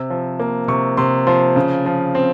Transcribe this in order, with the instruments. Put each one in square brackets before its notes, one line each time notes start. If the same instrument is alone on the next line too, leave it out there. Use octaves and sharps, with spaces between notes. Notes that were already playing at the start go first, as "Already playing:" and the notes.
Already playing: [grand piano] C3 E6
F3
A#3
C3 C#6
C3 C6
F3 C6
C#3
F3
C4